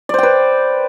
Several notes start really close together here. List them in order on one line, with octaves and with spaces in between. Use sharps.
D5 C5 G5 B4